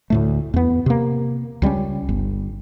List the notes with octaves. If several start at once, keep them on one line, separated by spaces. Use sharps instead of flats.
D2 A2 A3
E2 B3
C3 A#3
C#2 G3 G#3 C#4
G1